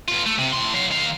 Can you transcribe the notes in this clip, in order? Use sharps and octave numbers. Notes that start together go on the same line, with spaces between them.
G2 F4
A3
C3
A2 C6
F#3 F5
D#3 F5